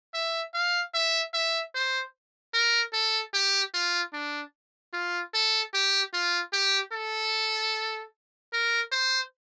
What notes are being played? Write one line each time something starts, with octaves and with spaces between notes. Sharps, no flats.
E5
F5
E5
E5
C5
A#4
A4
G4
F4
D4
F4
A4
G4
F4
G4
A4
A#4
C5